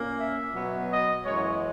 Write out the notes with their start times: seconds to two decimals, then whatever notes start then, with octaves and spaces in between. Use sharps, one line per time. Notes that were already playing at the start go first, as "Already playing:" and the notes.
Already playing: A#2 A#3 C#4
0.19 E5
0.54 B2 F#3 B3
0.91 D#5
1.25 F#2 E3 G#3 C#5